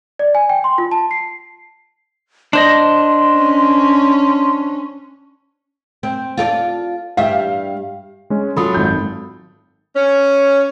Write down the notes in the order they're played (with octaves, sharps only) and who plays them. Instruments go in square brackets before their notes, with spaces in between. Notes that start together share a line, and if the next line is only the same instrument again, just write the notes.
[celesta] D5
G#5
G5
C6
F4
A5
C7
[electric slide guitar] D4 C5 D#5 [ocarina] C6
[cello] C#4
[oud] C4
F4 A4 D5
[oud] G2 G3 E5 [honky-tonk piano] F5
[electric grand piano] G#3 C#4
[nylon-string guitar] F#2 F#3 F4 [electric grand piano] A4 [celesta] B5 D#6
[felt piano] G#1 G6
[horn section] C#4